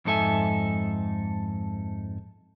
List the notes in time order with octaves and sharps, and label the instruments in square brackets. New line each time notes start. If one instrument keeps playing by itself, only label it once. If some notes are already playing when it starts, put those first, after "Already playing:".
[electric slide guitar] F2 G#2 D#4 A4 E5 G#5